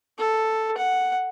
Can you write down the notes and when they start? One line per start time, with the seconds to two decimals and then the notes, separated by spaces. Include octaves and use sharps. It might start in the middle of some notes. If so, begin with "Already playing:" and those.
0.18 A4
0.77 F#5